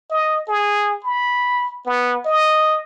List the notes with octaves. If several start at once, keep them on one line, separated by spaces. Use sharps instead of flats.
D#5
G#4
B5
B3
D#5